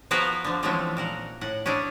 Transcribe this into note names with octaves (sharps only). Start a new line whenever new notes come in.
F3 B3 F#4 G#4 A#4 B4
D3 F3
E3 F3 G#3 A3 C4 C#4
A#2 A#4 F#5
A2 F#5
C#4 D4 E4 G#4